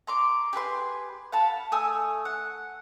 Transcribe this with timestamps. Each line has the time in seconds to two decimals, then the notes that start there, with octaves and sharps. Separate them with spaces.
0.07 A#5 C6 D6
0.53 G4 G#4 B4 C6
1.32 F5 F#5 A5 B5
1.72 A3 G#5 D#6 E6
2.25 F#5